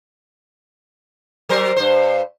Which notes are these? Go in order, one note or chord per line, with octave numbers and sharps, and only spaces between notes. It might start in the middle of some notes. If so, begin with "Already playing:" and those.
F#3 A#4 C5
G2 C5